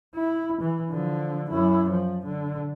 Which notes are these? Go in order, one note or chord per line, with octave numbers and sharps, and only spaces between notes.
E4
E3
D3 F3
F#2 E4
F3
D3